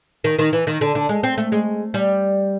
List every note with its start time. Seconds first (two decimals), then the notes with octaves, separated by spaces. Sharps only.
0.24 D#3
0.39 D#3
0.53 E3
0.67 D#3
0.81 D3
0.95 D3
1.09 G#3
1.23 C4
1.37 A3
1.52 G#3
1.94 G3